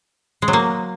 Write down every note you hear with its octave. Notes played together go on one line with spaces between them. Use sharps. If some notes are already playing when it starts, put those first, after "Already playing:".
G#3
F#3
A#3